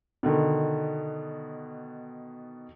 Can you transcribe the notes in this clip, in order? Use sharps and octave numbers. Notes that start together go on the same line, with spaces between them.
B2 D3 D#3